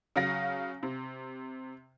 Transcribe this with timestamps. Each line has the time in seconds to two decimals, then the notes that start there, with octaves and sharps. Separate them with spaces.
0.16 C#3 F#3 F5 A#6
0.83 C3